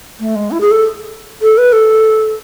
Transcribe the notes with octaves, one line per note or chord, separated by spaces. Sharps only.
A3
G#3
E4
G#4
A4
A4
B4
A4